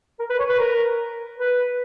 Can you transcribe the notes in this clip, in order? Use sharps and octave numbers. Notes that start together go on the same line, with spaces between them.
A#4
B4
C#5
B4
A#4
B4